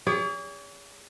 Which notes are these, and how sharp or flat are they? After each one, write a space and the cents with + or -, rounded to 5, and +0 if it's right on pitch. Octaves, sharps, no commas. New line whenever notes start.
G#4 -35 C#5 +45